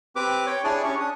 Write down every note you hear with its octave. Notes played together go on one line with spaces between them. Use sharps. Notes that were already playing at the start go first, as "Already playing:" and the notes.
C4 G4 B4 D6
C#5 G5
D4 E4 G#4 C#5 D5 G#5
C#4 G4 C#6
D4 D#6